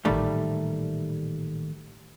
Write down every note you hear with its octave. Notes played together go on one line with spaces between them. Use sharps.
A1 A#2 D#3 G3 A3